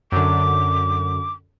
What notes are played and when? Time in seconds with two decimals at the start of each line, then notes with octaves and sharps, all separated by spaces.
0.12 F#2 D3 D6